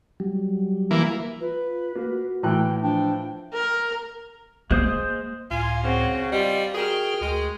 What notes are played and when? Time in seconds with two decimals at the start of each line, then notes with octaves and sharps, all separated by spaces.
0.20 F#3 G3
0.91 E3 A#3
1.40 F4 B4
1.95 A#3 F#4
2.43 A2 E3 G5 F#6
2.82 F3 D4 G5
3.54 A#4
4.71 G#3 A#3 C5 D#6
5.51 C#2 A2 F4 G#5
5.83 C#3 C4 F#4
6.32 G3 F4 D5 D#5
6.74 F#4 G#4 A#4 G5 F6
7.21 D2 G#3